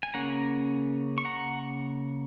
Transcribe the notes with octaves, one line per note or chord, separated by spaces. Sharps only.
G#5
C#3 A#3 C#4 F#5 A#5
C#6
F#5 A#5